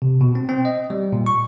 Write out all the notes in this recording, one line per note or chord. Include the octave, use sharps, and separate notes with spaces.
C3
B2
C4
C4
D#5
G3
A#2
C#6